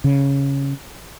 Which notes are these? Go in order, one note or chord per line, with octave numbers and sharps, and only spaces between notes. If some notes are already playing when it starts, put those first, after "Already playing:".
C#3